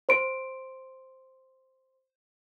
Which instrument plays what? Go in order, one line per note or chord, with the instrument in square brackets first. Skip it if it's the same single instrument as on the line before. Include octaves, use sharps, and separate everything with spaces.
[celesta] C5 C6 D7